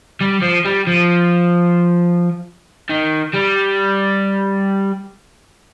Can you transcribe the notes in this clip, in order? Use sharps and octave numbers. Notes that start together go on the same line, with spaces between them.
G3
F3
G3
F3
D#3
G3